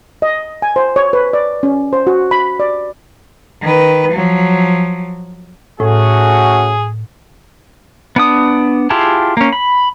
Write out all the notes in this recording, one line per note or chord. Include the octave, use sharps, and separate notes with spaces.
D#5
G#5
C5
C#5
B4
D5
C#4
C5
F#4
B5
D5
D#3 B4
F3 F#3
A2 A3 C#4 F#4 G#4
B3 D4 D#6
E4 F4 G4 G#4 A5
A#3 C#4
B5